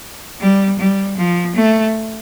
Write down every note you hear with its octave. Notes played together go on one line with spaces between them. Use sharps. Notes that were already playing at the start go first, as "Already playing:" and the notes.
G3
G3
F3
A3